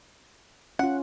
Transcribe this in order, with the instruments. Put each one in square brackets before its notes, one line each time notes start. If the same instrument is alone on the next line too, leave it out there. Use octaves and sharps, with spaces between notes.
[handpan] C#4 F4 [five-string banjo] F#5